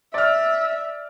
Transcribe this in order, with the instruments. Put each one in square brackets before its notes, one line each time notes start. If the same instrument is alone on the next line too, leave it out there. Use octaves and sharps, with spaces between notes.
[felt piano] D5 F6 [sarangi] E5